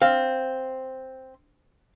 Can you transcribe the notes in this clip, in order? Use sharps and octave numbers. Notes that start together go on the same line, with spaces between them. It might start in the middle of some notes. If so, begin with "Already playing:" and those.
C4 F5